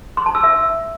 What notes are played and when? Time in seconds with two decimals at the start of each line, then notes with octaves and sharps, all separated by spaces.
0.17 C6
0.26 A5
0.35 E6
0.43 E5